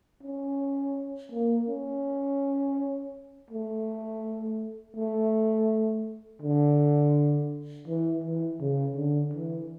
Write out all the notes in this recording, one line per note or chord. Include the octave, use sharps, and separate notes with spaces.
C#4
A#3
C#4
A3
A3
D3
E3
E3
C#3
D3
E3